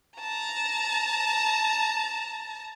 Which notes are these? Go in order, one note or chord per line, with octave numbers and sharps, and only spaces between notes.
A5 A#5